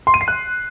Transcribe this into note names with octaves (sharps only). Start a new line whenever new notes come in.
C6
D#7
C7
F#6